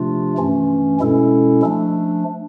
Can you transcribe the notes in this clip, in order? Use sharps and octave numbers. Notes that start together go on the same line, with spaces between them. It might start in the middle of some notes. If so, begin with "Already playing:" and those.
Already playing: C3 F3 A3 D4 F4
G2 E3 A3 C#4
B2 G#3 C#4 E4 A4
F3 A3 D4